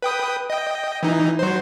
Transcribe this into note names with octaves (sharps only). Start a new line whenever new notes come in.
B4 G5 D#6
D#5 G5
E3 D#4
F#3 C5